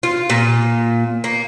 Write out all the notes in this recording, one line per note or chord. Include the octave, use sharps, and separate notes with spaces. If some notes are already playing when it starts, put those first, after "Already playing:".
F4
A#2
A#3